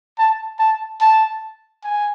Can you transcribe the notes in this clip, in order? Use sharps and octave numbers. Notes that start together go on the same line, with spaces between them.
A5
A5
A5
G#5